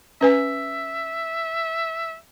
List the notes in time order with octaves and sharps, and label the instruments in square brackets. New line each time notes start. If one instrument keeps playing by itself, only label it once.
[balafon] C#4 B4 G#5 [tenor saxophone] E5